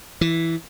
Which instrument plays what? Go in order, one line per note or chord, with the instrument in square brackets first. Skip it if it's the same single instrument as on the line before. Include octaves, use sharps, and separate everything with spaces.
[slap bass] E3